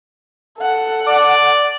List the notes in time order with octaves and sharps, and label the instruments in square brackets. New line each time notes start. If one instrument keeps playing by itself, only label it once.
[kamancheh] A4 F#5
[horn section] D5